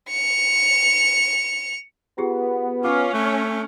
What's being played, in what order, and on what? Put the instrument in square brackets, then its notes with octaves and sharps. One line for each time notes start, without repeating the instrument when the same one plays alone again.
[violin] C#7 F7
[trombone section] B3 [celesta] F4 G4 G#4
[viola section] C#4 [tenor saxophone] F4 [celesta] D6 F6
[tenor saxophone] A3 [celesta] F#6